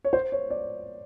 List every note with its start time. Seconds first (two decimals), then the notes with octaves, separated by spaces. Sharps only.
0.05 C#5
0.13 C5
0.32 C#5
0.50 D5